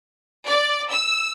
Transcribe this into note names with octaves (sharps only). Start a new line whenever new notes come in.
D5
E6